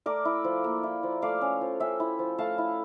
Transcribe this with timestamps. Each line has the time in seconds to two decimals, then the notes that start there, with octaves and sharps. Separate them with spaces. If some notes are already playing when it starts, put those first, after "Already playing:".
0.06 A3 A#4 D5
0.25 E4
0.44 F3
0.64 A#3
0.84 E4
1.03 F3
1.22 A3 D5 F5
1.41 C#4
1.61 F3
1.80 C#4 E5 G5
2.00 E4
2.19 F3
2.38 A3 F5 A5
2.58 E4